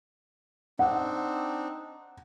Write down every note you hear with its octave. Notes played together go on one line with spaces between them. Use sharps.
C4 D4 D#4 F#5